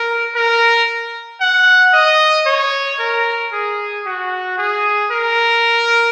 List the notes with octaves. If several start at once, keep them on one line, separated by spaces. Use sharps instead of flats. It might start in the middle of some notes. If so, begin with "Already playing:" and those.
Already playing: A#4
A#4
F#5
D#5
C#5
A#4
G#4
F#4
G#4
A#4